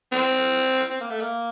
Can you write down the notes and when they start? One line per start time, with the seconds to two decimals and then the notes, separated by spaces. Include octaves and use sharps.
0.12 C4
0.90 C4
1.01 A#3
1.10 A3
1.21 A#3